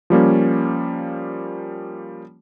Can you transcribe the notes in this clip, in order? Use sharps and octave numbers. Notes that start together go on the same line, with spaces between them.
F3 G3 A#3 C#4